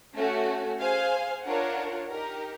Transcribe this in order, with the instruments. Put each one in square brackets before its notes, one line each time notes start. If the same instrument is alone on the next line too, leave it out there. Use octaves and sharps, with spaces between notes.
[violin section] A3 C#4 F#4
G#4 C5 F5 G#5
D4 F4 A#4 C#5 F#5
D#4 G4 A#4